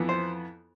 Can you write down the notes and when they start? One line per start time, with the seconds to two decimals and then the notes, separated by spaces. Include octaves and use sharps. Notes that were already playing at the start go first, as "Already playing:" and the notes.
Already playing: F2 E3 B3
0.09 C5